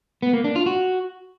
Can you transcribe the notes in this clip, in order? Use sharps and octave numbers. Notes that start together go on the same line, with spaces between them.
B3
A#3
D4
F4
F#4